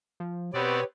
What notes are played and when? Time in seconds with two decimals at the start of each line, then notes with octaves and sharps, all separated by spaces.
0.20 F3
0.54 B2 B3 C4 G4 B4 C#5 D5